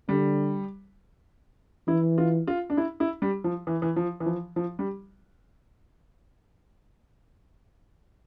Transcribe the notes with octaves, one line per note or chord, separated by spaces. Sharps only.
D3 G3
E3 E4
F4
F4
D4
E4
E4
G3
F3
E3
E3
F3
E3
F3
F3
G3